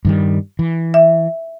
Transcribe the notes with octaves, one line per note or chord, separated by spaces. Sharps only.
G2 D#3 G3
E3
E5